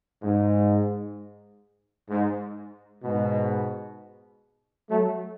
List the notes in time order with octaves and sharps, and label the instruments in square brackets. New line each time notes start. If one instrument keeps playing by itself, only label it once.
[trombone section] G#2
G#2
G#2 B2
F#3 A3